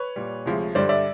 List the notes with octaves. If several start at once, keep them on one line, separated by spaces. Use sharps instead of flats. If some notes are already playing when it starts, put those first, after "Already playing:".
Already playing: B4 C#5
A#2 G3
D2 C3 F3 G#3
G2 D3 G3 C5 D5
D5 E5